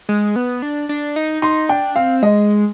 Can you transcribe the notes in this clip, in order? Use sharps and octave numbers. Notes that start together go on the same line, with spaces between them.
G#3
B3
D4
D4
D#4
D#4 C6
D4 G5
C4 F5
G#3 D#5